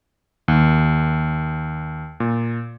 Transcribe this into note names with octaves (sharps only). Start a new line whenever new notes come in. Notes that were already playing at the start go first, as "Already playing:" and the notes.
D#2
A#2